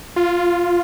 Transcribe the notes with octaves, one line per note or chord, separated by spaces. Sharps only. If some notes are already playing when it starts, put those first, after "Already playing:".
F4